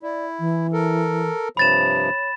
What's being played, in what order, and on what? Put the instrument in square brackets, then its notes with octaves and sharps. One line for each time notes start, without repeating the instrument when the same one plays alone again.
[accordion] E4 [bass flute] D5
[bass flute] E3
[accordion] A4 A#4
[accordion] G2 C3 F3 [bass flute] C#5 [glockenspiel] B5 A6 E7